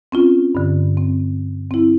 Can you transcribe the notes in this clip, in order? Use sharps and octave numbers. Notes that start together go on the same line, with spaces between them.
C4 C#4 F4
G2 D3
C4
C4 E4